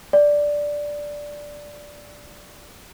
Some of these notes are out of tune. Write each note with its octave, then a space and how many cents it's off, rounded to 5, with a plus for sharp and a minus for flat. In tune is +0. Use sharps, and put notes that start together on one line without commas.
D5 -5